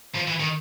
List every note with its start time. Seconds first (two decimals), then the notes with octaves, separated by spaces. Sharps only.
0.15 F3
0.28 E3
0.40 D#3